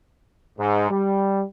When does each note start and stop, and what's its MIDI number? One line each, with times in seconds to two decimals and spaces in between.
0.58 0.89 44
0.91 1.43 55